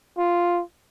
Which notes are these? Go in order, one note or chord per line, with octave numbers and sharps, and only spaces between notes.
F4